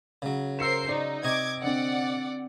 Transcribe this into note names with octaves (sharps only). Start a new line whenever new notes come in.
C#3 F#3
A#4 C5 E6 C7 C#7 E7
D#4 D5
C3 D#5 C#6 D6 G#6
D3 C4 D5 F#5